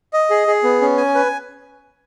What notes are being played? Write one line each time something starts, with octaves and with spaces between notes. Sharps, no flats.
D#5
G#4
G#4
B3
C#4
G#5
B4